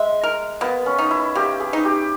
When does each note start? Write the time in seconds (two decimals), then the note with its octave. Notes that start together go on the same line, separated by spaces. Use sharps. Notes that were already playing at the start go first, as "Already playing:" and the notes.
Already playing: G#3 E5
0.23 A#4
0.61 A#3 B3
0.86 C#4
0.98 D#4
1.11 E4
1.36 A#3 G4
1.60 G#4
1.73 D#4
1.85 G4